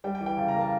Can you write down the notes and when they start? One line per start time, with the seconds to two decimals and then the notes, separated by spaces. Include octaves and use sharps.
0.04 G3 G5
0.15 G5
0.21 E3
0.26 G5
0.37 C#3 A5
0.48 A#5
0.55 A#3
0.61 A5